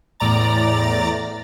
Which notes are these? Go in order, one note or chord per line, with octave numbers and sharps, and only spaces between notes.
E2 A2 D5 A#5 A6